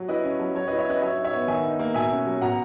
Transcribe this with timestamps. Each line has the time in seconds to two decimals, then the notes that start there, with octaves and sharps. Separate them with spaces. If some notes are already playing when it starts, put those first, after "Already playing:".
Already playing: F#3
0.08 E4 B4 D#5
0.23 C#4
0.39 F#3
0.55 F#3 C#5
0.67 E4 B4 D#5
0.78 C#5 E5
0.86 C#4 B4 D#5
1.01 F#3 C#5 E5
1.17 D#4
1.24 C#5 E5
1.33 B3
1.48 D#3 E5 G#5
1.64 D#4
1.79 A#3
1.94 B2 E5 G#5
2.11 C#4
2.26 F#3
2.42 B2 F#5 A#5